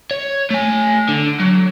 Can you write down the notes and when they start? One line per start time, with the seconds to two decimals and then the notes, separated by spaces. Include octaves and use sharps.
0.11 C#5
0.51 A3 G#5
1.09 D3
1.40 F#3